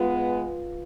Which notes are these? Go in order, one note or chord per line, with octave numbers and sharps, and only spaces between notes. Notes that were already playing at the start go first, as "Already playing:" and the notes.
Already playing: G#3 B3 F4 B4 F5